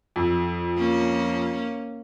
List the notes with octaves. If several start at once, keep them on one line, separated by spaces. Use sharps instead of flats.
F2
A#3 C#4